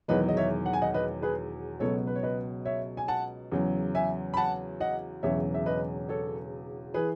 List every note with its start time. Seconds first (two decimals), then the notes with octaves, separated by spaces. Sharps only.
0.08 E1 E2 D#3 F#3 B4 D#5
0.29 D#5
0.37 C#5 E5
0.66 F#5
0.73 G#5
0.82 D#5 F#5
0.94 B4 D#5
1.22 G#4 B4
1.80 C#2 B2 F#3 A4 C#5
2.07 B4
2.16 C#5
2.23 B4 D#5
2.65 C#5 E5
2.97 G#5
3.08 F#5 A5
3.52 E2 C#3 F#3
3.95 E5 G#5
4.34 B5
4.37 F#5 A5
4.80 D#5 F#5
5.23 E1 E2 C#3 F#3 C#5 E5
5.54 E5
5.66 B4 D#5
6.09 A4 C#5
6.94 E3 G#4 B4